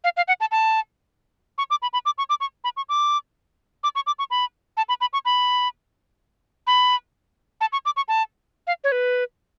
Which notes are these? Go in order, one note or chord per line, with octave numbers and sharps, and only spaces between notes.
F5
F5
F#5
A5
A5
C#6
D6
B5
B5
D6
C#6
D6
C#6
B5
C#6
D6
D6
C#6
D6
C#6
B5
A5
B5
B5
C#6
B5
B5
A5
C#6
D6
C#6
A5
F5
C#5
B4